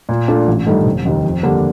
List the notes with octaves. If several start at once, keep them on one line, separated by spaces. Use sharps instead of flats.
A#2
A3 D4 F4
A1
G2 D#3 A3
F1
D#2 D#3
F2
D3 G3 A#3 D4